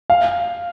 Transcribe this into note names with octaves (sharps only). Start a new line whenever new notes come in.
F5